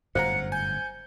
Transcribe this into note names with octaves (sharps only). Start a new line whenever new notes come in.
G1 F#2 A2 C5 F5 F#5 A#5 C#7
G#5 G6